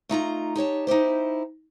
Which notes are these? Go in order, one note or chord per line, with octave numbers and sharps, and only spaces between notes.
A3 D#4 F4 A#5
D#4 G4 C#5 A5
D#4 E4 G4 C5